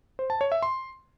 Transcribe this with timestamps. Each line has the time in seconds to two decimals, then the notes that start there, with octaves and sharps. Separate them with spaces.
0.19 C5
0.30 A5
0.41 C#5
0.52 E5
0.62 C6